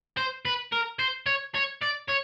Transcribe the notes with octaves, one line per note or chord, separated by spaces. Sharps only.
C5
B4
A#4
C5
C#5
C#5
D5
C#5